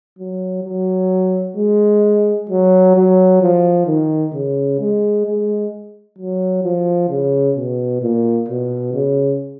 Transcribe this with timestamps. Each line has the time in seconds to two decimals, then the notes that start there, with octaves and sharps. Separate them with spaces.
0.19 F#3
0.64 F#3
1.56 G#3
2.49 F#3
2.95 F#3
3.42 F3
3.87 D#3
4.33 C#3
4.79 G#3
5.26 G#3
6.18 F#3
6.64 F3
7.09 C#3
7.56 B2
8.02 A#2
8.49 B2
8.94 C#3